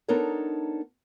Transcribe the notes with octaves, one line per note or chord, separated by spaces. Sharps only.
B3 D4 D#4 A4 A#4 C#5